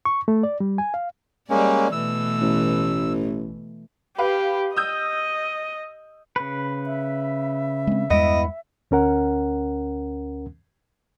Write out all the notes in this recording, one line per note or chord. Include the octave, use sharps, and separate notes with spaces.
C#6
A3
D5
G3
G#5
F5
G3 G#3 A#3 C#4 D5
B2 E3 A3 E6
A1
G4 B4 F5
D#5 D#6 E6 G6
C#3 B4
E5
G#3 C4
E2 G2 G#3 B3 E4 D#5
D2 C#4 A#4 F#5